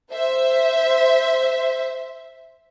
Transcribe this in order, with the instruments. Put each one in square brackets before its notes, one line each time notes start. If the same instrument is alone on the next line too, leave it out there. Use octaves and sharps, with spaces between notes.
[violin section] C5 E5